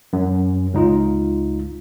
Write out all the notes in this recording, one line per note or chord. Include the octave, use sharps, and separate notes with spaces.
F#2
C#2 D#4 F4